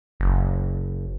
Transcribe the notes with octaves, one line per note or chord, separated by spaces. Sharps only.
F#1